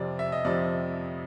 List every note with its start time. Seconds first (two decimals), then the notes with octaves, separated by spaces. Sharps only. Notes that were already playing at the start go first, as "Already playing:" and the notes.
Already playing: F2 C3 F3 D5
0.19 E5
0.32 D#5
0.45 F2 C3 F3 D5